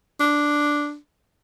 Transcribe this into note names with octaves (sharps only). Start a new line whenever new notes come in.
D4